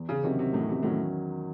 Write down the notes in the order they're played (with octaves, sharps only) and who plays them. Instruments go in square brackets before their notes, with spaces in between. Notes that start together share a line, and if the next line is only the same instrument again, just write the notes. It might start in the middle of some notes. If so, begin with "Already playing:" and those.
Already playing: [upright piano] E2
[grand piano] C#3
[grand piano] C3 [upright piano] D#3 F#3 C#4
[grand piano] C3
[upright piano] E2 [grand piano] A2
[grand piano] C3
[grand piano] A2 [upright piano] D#3 F#3 C#4